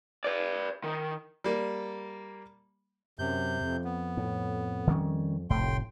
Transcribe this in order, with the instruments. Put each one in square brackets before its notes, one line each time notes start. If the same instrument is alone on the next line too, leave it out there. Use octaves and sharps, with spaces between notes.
[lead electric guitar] B4 D5
D#3
[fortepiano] G3 A#3
[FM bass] F#2 [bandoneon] C3 G6
[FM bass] F2
[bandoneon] B3
[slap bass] A2
D#3 G3 C#4
[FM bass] F1 [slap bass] C2 A2 [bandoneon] G5 C6